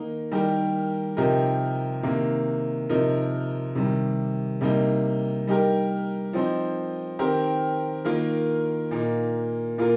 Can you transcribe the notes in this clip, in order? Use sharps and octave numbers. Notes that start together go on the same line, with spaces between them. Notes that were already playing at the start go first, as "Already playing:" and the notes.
Already playing: D#3 A#3 D#4
D#3 G3 D#4 G4 A#4
C3 F3 D#4 G4 A#4
C3 D#3 A#3
C3 F3 D#4 A#4
C3 D#3 G3
C3 G3 A#3 D#4
G3 D#4 G4 A#4
F3 C4 D#4
D#3 C4 G4 A#4
D#3 A#3 F4 A#4
A#2 A#3 D#4
A#2 A#3 F4 A#4